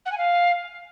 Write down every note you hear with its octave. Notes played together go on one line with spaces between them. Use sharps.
F#5
G#5
F5